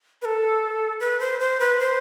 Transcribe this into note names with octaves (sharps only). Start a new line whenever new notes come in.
B4
A4
B4
C5
C5
B4
C5